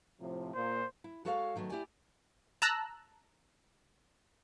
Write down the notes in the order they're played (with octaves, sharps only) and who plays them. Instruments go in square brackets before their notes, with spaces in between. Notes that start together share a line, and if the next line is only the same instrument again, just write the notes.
[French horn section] A2 C3 F3
[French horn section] A#2 [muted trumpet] C5
[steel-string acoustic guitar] E4
G#3 F#4 A4 C#5 E5 F5
D#3 F#3 A3 B3
E4 G4 D5 G#5
[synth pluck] A5 A#5 E6 F#6